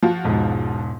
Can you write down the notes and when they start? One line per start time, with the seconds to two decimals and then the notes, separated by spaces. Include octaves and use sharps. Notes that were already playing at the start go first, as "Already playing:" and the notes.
0.03 F3 F4 F#4
0.24 E1 G#2